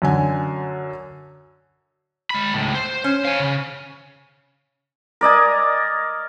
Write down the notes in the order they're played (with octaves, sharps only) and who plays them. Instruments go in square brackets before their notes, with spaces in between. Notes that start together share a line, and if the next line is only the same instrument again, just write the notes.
[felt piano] F#2 D3 G#5
[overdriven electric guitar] G#3 B5
C#2 A2
C5
[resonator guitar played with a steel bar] C#4
[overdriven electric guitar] F5 G#5
C#3
[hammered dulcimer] A#4 D5 D#5 G#5